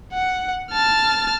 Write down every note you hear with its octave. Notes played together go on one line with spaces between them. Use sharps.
F#5
A5 F6